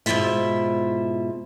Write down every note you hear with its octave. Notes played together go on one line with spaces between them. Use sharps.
G#2 B2 D#3 E4 F4 E5